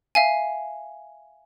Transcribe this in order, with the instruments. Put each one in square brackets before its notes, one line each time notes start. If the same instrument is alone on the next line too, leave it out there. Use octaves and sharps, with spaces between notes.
[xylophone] E5 F5 G#5